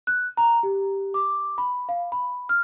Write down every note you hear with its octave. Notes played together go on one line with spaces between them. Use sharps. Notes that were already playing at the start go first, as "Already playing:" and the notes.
F#6
A#5
G4
D6
B5
F5
B5
F6